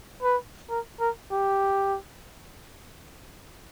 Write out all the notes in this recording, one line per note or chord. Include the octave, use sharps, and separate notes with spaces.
B4
A#4
A#4
G4